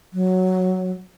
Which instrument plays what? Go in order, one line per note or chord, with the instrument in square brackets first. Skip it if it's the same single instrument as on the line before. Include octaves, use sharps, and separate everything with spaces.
[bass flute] F#3